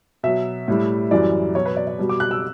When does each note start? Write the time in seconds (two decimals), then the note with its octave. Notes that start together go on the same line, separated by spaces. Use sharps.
0.23 B2 F#3 E5
0.68 A2 G3
1.11 F#2 E3 G3 D5
1.55 B2 F#3 C#5
1.66 B4
1.77 D5
1.87 D5
1.99 B2 G3
2.09 D6
2.20 F#6
2.31 E6